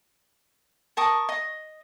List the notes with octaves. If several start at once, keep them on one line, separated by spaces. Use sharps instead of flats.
A#4 A5 C#6 D#6
D#5